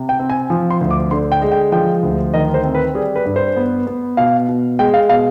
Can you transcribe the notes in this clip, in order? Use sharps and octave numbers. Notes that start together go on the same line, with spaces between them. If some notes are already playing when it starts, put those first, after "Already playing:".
Already playing: C3
G5
C4
G#5
F3
C6
D2
D6
D3 C6
G5
G#3
G5
F3 G5
D2
D#3 D#5
C5
C4
B4
G3 G#4
B4
G2
C5
B3
B3
B2 F5
B2
G#3 G5
F5
B2 F5